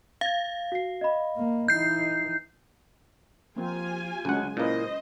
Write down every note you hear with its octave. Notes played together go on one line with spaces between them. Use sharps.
F5 G#6 A6
F#4 C7
D#5 B5
A#3
E3 D#4 G6 C7
F3 A#3 C4 F4 G4 G#5
D2 C#3 F#3 G#3 C#4 F#5
A#2 A#3 C#4 E4 B4 C5 D#5